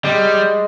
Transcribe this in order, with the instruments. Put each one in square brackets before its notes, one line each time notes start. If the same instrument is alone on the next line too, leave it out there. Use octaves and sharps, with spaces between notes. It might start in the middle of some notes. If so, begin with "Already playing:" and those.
[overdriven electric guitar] G3 [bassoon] G#3